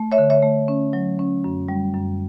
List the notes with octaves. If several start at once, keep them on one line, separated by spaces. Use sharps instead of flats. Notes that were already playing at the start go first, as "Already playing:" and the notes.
Already playing: A3
C#5 E5
D3
C#5 E5
A3
C#4
F#3
C#4
F#2
G3
F#2